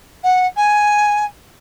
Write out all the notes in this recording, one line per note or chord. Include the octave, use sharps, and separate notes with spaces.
F#5
G#5